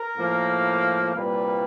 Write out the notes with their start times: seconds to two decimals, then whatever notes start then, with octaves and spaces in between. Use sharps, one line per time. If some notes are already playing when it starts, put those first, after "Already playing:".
Already playing: A#4
0.16 A2 F3 A#3
1.15 C2 A#2 G3 A#3 B4